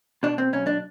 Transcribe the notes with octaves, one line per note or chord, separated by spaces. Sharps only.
B2 D4
C4
B1 C#4
D4